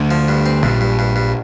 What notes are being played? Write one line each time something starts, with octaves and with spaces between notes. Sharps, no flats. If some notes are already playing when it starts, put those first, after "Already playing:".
Already playing: D2 D3
F3
G2
C4
A#1 G2 A#2
G2
G2
G2